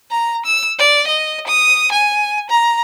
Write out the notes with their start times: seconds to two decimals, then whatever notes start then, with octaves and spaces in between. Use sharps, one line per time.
0.11 A#5
0.46 E6
0.79 D5
1.07 D#5
1.47 D#6
1.92 G#5
2.50 A#5